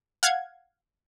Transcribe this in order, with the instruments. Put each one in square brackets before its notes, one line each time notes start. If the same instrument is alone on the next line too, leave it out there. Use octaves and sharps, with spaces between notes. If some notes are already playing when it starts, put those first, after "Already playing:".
[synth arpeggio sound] F5 F#5 G#6